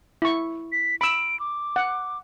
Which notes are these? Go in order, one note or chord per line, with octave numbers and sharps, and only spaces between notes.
E4 C#6
B6
B5 E6 D7
D6
F#5